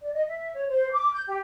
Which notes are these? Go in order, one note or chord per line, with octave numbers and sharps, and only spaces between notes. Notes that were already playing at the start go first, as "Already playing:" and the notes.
D5
D#5
E5
C#5
C5
D6
G6
G4